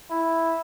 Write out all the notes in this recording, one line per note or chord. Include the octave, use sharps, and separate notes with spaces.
E4